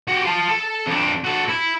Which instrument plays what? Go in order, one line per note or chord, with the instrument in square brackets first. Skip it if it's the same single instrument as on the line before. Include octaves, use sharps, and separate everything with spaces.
[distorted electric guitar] F#4 G4
F4 A5
A4
F2 D4
F#4 A4
E4